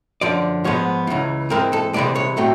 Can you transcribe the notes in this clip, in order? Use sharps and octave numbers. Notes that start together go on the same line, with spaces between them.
F#2 D3 F3 D5
G#2 F3 G#3 B3 C#5
C#2 C#3 E3
G#2 E3 G#3 C4 A#4
A4
C2 C3 E3 G#3 D5
C#5
A2 F#3 A3 C4